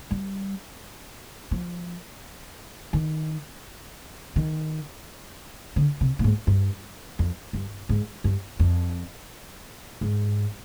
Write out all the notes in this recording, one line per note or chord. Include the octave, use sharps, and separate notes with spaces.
G3
F3
D#3
D#3
D3
C3
A#2
G#2
G2
F2
G2
G#2
G2
F2
G#2